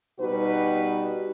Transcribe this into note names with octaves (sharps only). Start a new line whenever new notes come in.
B2 G3 D#4 F#4 G4 B4